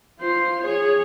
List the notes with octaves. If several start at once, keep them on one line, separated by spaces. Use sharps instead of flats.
F4 C5
G#4 C#5